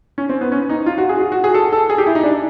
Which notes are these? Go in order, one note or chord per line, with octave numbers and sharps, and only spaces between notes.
C#4
C4
B3
C#4
D#4
F4
F#4
G#4
F#4
F#4
G#4
A4
A4
G#4
G4
E4
D#4
D4